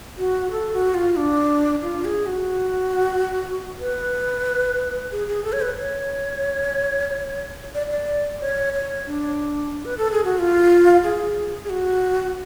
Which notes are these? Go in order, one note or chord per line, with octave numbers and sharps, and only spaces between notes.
F#4
A4
F#4
F4
D4
F4
G#4
F#4
B4
G#4
G#4
A4
C#5
B4
C#5
D5
D5
C#5
C#5
D4
B4
A4
G#4
F#4
F4
G#4
G#4
F#4